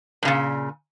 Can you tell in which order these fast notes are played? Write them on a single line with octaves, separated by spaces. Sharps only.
G2 C#3 A#2